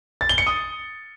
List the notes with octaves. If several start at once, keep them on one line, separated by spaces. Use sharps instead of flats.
A6
G7
C#7
D#6